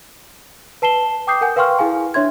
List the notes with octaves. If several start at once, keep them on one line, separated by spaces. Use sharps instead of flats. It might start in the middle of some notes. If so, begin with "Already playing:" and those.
B4 A5 C7 E7 G7
G5 D6 D#6 G6 C7
A#4 F#5 G#5 G6
B4 F5 G5 C6 C#6 F6
E4 G#4 F5 G#5
D4 C#5 E5 C6 G#6